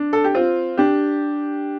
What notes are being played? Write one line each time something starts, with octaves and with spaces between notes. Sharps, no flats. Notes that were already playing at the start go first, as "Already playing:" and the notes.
Already playing: D4
A4
G4
C4 F4
D4 G4